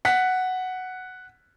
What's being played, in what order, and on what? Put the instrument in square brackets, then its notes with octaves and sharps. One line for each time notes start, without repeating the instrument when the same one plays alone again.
[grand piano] F#5 B6